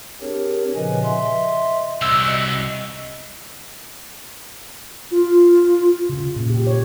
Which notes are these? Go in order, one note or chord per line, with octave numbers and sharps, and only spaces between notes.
C4 D4 G4 G#4 A#4 C#5
A#2 C#3 F3 B4 D#5 G#5
D#5 E5 C6
C2 E6
F#4 D#5
F4
C#3
A#2
G4
C#5